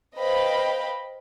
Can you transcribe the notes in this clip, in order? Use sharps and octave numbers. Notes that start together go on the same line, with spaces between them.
B4 C5 D#5 F5 G5 B5